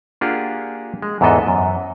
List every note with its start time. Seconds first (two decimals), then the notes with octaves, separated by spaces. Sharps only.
0.21 A#3 D4 F4 G4 G#4 F#5
1.02 G#3
1.21 E2 G#2 E3 B3 A4 D#5
1.47 F#2